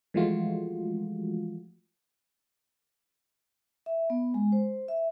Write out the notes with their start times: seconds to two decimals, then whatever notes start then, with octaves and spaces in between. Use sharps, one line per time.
0.14 E3 F3 G#3 A3 F4 F#4
3.86 E5
4.10 B3
4.34 G#3
4.52 C5
4.88 E5